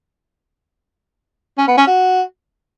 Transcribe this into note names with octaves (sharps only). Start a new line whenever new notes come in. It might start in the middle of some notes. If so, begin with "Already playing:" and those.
C#4
B3
C#4
F#4